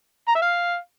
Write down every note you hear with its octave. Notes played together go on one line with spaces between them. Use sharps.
A#5
E5
F5